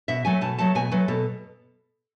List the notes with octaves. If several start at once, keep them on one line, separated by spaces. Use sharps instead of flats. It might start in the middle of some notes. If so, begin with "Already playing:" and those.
B2 E5
F#3 A3 G#5
B2 A5
F#3 A3 A5
B2 G#5
F#3 A3 B4
B2 A4